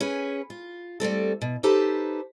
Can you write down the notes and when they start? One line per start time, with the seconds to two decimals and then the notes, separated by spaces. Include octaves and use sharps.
0.01 C#4 G#4 B4
0.50 F4
1.00 G3 A3 C4 A4
1.42 B2
1.63 D#4 G4 A4 B4 C5 A5